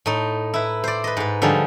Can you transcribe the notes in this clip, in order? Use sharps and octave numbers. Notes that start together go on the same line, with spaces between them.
A2 D#4
E4 B4
C5 D5
B4 D#5
G#2 B4
D3 F3 G3 D#4 G#4